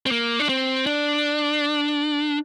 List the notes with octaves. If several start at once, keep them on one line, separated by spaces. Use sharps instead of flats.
C4
A#3
D4
C4
D4